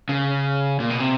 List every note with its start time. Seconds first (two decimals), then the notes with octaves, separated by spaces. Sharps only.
0.09 C#3
0.80 A#2
0.90 B2
1.00 C3